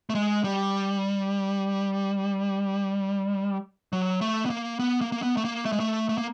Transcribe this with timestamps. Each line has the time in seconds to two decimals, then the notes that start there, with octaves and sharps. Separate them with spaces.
0.10 A3
0.15 G#3
0.44 G3
3.93 F#3
4.21 A3
4.46 B3
4.50 A#3
4.79 B3
5.01 A#3
5.12 A#3
5.22 B3
5.37 A3
5.45 A#3
5.65 A3
5.72 G#3
5.80 A3
6.09 A3
6.18 A#3